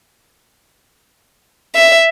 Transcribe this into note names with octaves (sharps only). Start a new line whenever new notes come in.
E5